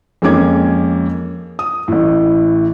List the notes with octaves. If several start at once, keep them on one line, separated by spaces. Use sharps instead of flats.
F2 G#3 A#3 C#4 D6 G#6
D#6
A1 A2